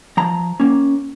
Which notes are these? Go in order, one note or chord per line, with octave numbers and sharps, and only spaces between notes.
F3 A#5
A#3 C#4